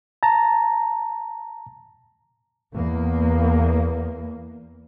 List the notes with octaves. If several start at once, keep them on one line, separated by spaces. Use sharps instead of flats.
A5 A#5
E2 A#3